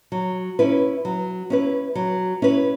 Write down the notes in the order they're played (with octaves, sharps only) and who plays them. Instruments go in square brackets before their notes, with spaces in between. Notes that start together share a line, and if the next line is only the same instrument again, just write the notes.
[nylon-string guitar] F#3
C#4 E4 B4
F#3
C#4 E4 B4
F#3
C#4 E4 B4